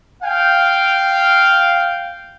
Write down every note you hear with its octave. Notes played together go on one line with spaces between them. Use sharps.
F5 G5